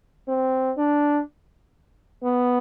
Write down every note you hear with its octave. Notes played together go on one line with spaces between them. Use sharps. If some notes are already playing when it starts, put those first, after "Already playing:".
C4
D4
B3